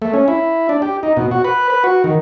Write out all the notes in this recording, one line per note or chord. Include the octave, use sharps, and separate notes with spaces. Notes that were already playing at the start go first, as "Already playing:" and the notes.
A3
C#4
E4
D4
G4
D#4
B2
F#4
B4
B4
F#4
D#3